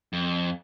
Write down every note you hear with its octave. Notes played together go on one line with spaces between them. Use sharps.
F2